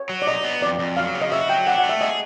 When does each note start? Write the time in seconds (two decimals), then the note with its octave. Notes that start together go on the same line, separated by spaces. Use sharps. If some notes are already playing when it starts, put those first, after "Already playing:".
Already playing: C#5
0.09 F#3
0.22 D5
0.27 D#4 D#5
0.44 B3
0.61 F2 D5
0.79 F2
0.97 F#3 F5
1.14 C#3
1.22 D#5
1.32 F#4 E5
1.49 F#3 G5
1.67 D4 F#5
1.78 F#5
1.84 A3
1.89 E5
2.01 G#4 D#5